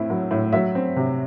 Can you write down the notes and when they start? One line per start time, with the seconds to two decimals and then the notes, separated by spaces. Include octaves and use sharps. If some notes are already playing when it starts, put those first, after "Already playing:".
Already playing: A2 C4 E4
0.10 F#3
0.31 A2
0.53 F#3 E5
0.75 C4
0.96 C3